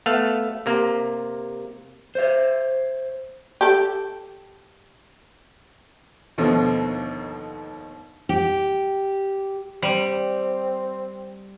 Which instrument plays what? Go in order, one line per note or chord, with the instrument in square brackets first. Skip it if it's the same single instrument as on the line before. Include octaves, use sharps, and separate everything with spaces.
[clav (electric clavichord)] A3 B3 F5
C3 A#3
[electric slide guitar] C5 C#5 E5
[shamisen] G4 A4
[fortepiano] D#2 B2 D3 D#3 F3 A3
[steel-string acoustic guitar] G4
[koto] G3 [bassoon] C4